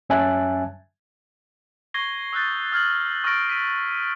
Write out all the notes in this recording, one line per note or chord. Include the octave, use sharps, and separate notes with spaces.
F#2 C#4 E5 G#5 A5 F#6
C#6 G#6 A#6 C7 G7
D#6 E6 F#6 G6 A6
D#6 F6 G#6 F#7
C#6 D#6 F6 A6 A#6 D7
A#6 B6 D#7